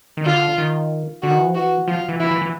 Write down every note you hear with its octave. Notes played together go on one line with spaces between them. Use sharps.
D#3
D3 F4
D#3
D3 F#4
D#3
E3
F3
E3 F#4
F3 F4
E3
E3 E4
E3
E3